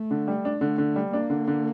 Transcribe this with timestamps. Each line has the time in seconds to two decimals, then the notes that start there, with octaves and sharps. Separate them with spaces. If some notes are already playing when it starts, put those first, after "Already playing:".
Already playing: A3
0.11 D3
0.27 G3
0.45 D4
0.61 D3 A3
0.78 D3
0.96 G3
1.12 A#3 D4
1.30 D3
1.48 D3